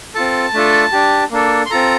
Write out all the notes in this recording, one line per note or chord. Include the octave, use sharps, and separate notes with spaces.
C4 F4 A4 A5
A3 D4 F4 A4
D4 G4
A#3 D4 A4
C6
C4 F4 A4 A#5